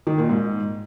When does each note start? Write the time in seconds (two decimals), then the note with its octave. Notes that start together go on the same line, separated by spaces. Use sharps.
0.07 D#3
0.18 A#2
0.29 G#2